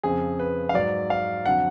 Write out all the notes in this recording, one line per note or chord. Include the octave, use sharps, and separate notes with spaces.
F2 C#3 F3 G#4
B4
F5
G#2 F#3 D5
F5
F2 D3 F#3 F#5